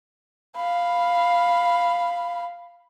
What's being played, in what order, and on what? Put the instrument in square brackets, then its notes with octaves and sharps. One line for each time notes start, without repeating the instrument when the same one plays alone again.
[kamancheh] F5 B5